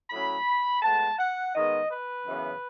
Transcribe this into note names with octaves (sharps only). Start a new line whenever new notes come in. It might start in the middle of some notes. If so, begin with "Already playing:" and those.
A2 F#3 C#4 B5
A2 G#3 B3 A5
F#5
D#3 G#3 B3 D#5
B4
F#2 C#3 E3 B3